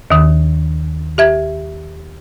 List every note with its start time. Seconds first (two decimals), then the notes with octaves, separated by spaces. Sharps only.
0.10 D#2 D#3
1.18 G4 E5 G#6